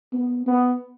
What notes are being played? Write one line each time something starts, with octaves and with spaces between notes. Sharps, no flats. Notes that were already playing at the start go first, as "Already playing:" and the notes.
B3
B3